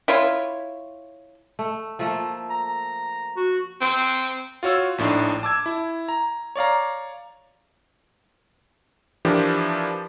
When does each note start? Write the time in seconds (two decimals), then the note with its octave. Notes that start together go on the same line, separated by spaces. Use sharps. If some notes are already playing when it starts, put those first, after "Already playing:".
0.08 E4 F4 C#5
1.59 A3
1.99 F3 A3 A#3
2.50 A#5
3.36 F#4
3.81 C4
4.63 F4 F#4 C#5 E6
4.98 A#1 A2 D4 D#4
5.43 A5 D6 E6 G#6
5.66 E4
6.09 A#5
6.56 C#5 D5 F5 A#5
9.25 E3 F3 D4 G4 A#4